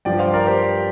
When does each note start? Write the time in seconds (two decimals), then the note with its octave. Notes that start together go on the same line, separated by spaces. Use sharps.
0.05 G2 F3 D5 G5
0.19 C5 F5
0.34 A#4 D5
0.47 G4 C5